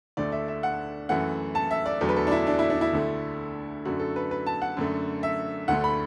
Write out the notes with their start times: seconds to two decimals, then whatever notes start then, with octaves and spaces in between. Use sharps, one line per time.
0.17 D2 D3 A3 D5
0.32 E5
0.48 E5
0.63 F#5
1.09 F#2 E3 A3 F#5
1.55 A5
1.71 E5
1.86 D5
2.01 E2 D3 F#3 A3
2.09 B4
2.16 A4
2.27 D4
2.31 E4
2.47 D4
2.59 E4
2.70 D4
2.81 E4
2.93 D2 D3 A3
3.85 F#2 D3 A3 F#4
4.00 A4
4.16 B4
4.31 B4
4.47 A5
4.62 F#5
4.77 F#2 D3 A3
5.23 E5
5.68 D2 D3 A3 F#5
5.84 B5